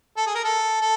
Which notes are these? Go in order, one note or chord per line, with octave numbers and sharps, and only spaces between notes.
A4
G#4
A#4
A4
A4